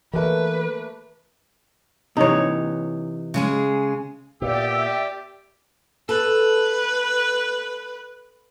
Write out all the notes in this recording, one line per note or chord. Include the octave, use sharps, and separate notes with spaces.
E3 A3 A#3 B4
C3 E3 D#4 C#5
C#3 G#3 G#4
A#2 B3 G4 D5 E5 G5 E6
A4 B4